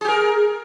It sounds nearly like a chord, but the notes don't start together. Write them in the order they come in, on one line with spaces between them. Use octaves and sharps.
G#4 G4 A#4